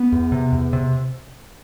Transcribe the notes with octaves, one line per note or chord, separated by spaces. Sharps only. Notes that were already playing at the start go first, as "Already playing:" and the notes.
Already playing: B3
E2
C3
E2
C3